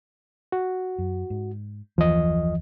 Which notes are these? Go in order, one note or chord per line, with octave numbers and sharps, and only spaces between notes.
F#4
F#2
G#2
F#1 D#2 E3 F3 D#5